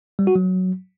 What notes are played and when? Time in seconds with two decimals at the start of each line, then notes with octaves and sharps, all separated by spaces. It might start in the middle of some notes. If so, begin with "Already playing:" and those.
0.19 G3
0.27 F#4
0.35 F#3